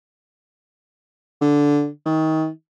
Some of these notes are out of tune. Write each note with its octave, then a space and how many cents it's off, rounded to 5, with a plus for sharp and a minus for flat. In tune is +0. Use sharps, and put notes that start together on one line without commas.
D3 -10
D#3 +25